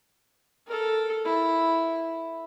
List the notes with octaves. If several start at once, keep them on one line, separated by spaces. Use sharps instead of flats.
A4 A#4
E4